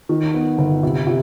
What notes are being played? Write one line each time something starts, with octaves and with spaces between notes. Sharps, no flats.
D#3
B3
G1
C3
C3